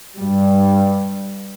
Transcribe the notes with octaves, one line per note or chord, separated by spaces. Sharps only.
G2 G3